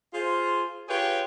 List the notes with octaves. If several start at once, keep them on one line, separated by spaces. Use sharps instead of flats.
F4 G#4 C5
F4 G4 G#4 B4 C#5 G5